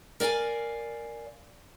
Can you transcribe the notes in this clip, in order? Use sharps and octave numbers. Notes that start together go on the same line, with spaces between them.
A#4 D5 D#5 F5 G#5